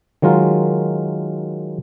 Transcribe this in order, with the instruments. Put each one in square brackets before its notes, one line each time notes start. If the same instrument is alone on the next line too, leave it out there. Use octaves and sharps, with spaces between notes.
[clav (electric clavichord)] D#3 F#3 G#3 F4 A#4